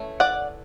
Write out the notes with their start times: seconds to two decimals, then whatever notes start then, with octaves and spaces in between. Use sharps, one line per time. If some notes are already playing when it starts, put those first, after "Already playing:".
Already playing: E3 A3 C#4
0.20 D5 F#5